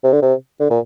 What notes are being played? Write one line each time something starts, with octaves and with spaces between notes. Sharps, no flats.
C3
D3
C3
D3
A#2